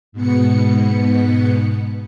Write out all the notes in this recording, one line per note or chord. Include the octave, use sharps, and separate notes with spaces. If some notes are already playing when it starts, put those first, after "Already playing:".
G#2 B2 B3 C#7